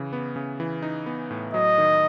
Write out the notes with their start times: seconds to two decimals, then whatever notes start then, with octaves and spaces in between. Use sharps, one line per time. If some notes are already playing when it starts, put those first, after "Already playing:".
Already playing: C#3 E3
0.13 B3
0.36 C#3
0.60 E3
0.82 D#4
1.06 B3
1.31 A2
1.54 F#3 D#5
1.78 D#3